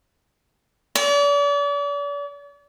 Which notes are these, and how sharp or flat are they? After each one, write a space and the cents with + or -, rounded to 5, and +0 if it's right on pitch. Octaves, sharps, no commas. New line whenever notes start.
D5 -40